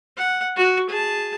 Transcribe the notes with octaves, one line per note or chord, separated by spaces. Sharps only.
F#5
F#4
G#4 A5